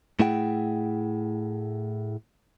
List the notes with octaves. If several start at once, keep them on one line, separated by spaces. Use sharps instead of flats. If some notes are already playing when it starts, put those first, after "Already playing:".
A2 A3 E4 G#4 F#5 G5